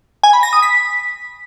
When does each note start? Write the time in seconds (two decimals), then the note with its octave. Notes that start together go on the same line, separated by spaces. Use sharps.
0.23 G#5
0.33 B5
0.43 A#6
0.53 D#6
0.62 B6